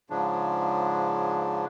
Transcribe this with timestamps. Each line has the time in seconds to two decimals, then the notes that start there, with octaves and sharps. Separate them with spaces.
0.10 G#2 C#3 F3 D4